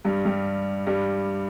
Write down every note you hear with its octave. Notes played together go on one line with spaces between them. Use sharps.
G2 G3
G2 G3
G2 G3